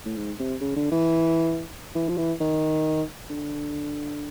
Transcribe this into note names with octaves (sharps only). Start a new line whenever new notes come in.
A2
G#2
C3
C#3
D3
E3
E3
F3
E3
D#3
D3